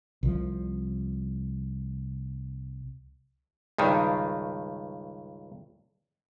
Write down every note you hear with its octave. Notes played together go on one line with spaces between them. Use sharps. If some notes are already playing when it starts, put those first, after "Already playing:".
C2 F3
C#2 G2 D#3